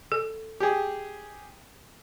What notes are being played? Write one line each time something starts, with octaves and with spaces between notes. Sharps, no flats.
A4
G4 G#4